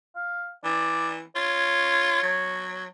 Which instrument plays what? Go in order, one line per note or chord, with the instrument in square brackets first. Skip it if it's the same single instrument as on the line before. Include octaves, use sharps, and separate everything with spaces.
[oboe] F5
[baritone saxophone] E3 [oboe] D5
[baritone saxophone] F4 [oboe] C#5
[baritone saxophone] F#3